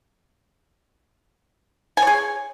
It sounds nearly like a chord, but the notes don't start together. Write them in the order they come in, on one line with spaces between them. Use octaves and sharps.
G#5 C#5 G#4